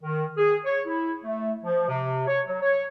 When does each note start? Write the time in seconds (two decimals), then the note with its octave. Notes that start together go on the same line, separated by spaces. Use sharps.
0.02 D#3
0.37 G#4
0.65 C#5
0.86 E4
1.23 A3
1.63 F3
1.88 C3
2.27 C#5
2.47 F#3
2.62 C#5